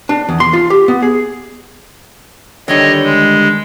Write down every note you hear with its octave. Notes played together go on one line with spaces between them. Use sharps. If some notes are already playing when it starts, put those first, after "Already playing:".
D4
E2
C6
F4
G4
B3
G#4
D3 D#3 G3 C#5 D#5
G#3